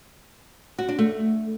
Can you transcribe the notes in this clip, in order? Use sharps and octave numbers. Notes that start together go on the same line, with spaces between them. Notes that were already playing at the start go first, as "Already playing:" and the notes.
F#4
D4
A3